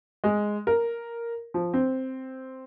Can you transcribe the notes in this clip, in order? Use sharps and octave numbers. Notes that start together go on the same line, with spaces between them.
G#3
A#4
F3
C4